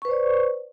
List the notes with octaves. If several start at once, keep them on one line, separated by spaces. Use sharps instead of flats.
B4 C5 D5 C#6